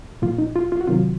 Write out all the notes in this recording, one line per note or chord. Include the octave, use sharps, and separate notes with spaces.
A#2 F3 F4
D#4
F4
F4
F#4
C3 D#3 F#3 F4